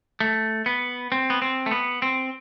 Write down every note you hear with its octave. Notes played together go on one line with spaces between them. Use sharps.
A3
B3
C4
B3
C4
A3
B3
C4